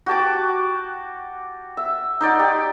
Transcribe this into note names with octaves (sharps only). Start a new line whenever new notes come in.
F#4 G4 A5 D6
E5
D#4 C5 D5 F#5
G4